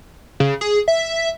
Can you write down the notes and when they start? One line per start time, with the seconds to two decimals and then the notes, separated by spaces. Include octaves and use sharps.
0.40 C#3
0.61 G#4
0.88 E5